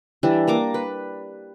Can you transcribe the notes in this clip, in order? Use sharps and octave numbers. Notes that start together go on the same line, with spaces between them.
E3 G3 D4
A#3 A#5 D6
B4